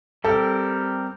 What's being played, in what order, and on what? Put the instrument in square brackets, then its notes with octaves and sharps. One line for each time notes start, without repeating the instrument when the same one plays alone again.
[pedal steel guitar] G3 C4 G4 A#4 [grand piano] A4